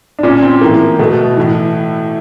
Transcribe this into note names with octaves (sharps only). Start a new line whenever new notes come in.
D4
A#2 C#4
C4
A2 E3 A#3
B2 A3
A2 E3